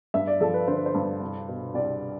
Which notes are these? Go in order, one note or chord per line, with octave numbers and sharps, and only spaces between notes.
G2 E5
D5
F3 A4
B4
D3 C5
B4
C5
G2
C2
B2
C2 D5